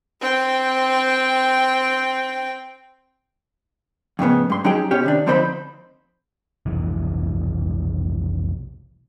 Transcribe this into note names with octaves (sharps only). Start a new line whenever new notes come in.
C4 G5
F2 A2 C#3 B3
G2 C6
F#3 C#4 D#4 G4 G#4 G5
B2 C4 C#4 G4
C3 D#3 D4
D3 F3 C4 D#4 C5 B5
F1 B1 E3